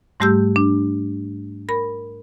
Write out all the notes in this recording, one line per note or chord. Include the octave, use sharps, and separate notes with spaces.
G#2 G3 A3 G4 E6 G6
D4
A#4 B5